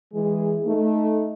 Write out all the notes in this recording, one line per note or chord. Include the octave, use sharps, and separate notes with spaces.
E3 G#3 G#4
A3 D#4